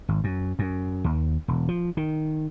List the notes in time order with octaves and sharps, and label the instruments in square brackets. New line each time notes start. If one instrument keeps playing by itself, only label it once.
[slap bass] G#1
F#2
F#2
D#2
E1
F3
D#3